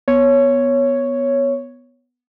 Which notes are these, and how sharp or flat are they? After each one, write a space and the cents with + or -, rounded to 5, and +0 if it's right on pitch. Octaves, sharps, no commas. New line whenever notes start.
B3 +0 C#5 +0